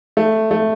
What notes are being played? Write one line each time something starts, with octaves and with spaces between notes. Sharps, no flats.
A3
A3